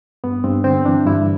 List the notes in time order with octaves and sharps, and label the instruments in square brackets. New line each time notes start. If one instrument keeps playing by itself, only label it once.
[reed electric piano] G2 B3
G2 C4
D3 C4
E3 D4
G2 E4